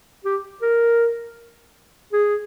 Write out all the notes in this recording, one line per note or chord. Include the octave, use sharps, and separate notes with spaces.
G4
A#4
G#4